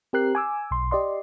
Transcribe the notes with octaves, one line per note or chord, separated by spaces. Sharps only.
C4 G4 A#4 F#6 C7
G#5 D6 E6
B1 C6
G4 D5 D#5 C6